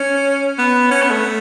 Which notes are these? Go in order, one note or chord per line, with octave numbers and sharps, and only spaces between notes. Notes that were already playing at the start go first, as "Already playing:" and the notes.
Already playing: C#4
B3
C#4
B3
A3